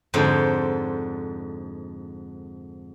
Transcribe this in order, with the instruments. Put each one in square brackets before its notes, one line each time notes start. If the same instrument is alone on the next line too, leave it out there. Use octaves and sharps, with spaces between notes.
[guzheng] F2 G#2 D3 C5 C#5